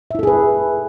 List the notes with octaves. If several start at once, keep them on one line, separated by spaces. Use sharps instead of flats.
E4 G#4 A4 B4 E5